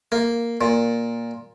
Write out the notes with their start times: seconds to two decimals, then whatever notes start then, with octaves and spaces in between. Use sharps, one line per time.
0.12 A#3
0.61 A#2